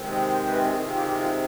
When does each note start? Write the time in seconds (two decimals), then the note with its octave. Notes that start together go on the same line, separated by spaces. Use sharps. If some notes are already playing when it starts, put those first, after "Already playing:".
Already playing: C3 D#3 G#3 C4
0.11 D#5
0.32 C5
0.48 B4
0.54 G#4
0.75 C3 D#3 G#3 C4 G#4
0.86 F4
0.96 G4
1.17 F4